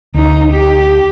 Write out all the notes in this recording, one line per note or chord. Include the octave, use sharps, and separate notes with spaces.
D2 D#4
G4